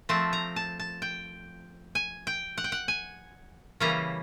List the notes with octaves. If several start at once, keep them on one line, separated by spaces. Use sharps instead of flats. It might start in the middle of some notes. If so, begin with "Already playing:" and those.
F3 A3 C4 A5
A#5
A5
A5
G5
G#5
G5
F#5
G5
F#5
G#5
C#3 E3 G3 A#3 C#4 A#5